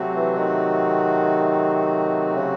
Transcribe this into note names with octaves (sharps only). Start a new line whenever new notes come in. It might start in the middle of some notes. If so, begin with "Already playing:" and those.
Already playing: C3 F#3 A3 C4 F#4
E3
D#3
C#3